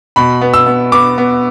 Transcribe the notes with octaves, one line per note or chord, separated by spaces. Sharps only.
B2 B5
B3
E6
B3
B3 D6
B3